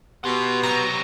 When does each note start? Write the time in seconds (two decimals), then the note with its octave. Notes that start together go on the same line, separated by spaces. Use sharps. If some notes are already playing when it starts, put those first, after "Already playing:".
0.24 B2 G4 F#5 C6
0.63 C3 F#3 A#5